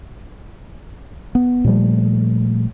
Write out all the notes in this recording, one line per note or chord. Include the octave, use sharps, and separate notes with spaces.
B3
A#2 F3 G3 A3